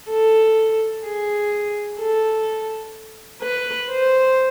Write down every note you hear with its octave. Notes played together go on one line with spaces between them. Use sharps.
A4
G#4
A4
B4
C5